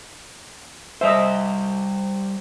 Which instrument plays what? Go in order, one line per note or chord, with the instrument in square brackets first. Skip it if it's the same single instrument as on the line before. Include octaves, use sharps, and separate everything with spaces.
[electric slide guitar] G3 C5 [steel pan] D#5 E5